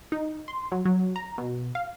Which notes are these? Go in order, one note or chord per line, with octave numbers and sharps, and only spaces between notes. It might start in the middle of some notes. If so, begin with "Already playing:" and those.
D#4
C6
F#3
F#3
A#5
B2
F5